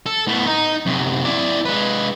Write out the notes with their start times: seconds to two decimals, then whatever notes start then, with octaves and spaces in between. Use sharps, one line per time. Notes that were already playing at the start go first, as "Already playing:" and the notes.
0.06 A4
0.27 A2 B3
0.47 D#4
0.86 F#2 C3
1.24 E4 D5
1.65 G#3 B4